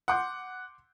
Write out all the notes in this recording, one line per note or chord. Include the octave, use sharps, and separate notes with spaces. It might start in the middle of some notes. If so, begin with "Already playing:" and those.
F#5 C6 D6 G6